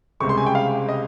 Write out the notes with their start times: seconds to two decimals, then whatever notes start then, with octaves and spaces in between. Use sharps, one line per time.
0.20 C#2 C3 G3 C#6
0.29 C6
0.37 G#5
0.46 G5
0.55 F5
0.89 D#5